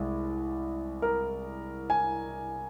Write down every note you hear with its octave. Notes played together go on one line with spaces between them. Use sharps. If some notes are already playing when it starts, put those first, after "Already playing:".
Already playing: C2 G#3
A#4
G#5